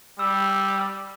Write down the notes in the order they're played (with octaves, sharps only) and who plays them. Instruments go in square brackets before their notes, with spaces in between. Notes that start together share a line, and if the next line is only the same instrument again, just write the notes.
[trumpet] G3 [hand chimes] E6